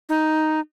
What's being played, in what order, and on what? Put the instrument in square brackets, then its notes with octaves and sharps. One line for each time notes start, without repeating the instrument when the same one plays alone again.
[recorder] D#4